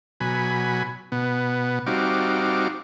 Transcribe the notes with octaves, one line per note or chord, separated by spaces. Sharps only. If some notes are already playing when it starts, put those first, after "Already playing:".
B2 F#3 G#5 B5
B2 B3
G3 C4 D#4 F#4 F5 D6